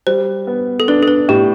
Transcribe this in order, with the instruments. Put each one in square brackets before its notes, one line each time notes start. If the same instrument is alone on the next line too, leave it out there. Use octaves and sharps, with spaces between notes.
[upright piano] G3 [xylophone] C5
[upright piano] B3
[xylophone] A4
[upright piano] D4 [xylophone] B4
[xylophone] A4
B4
[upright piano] A2 [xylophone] G4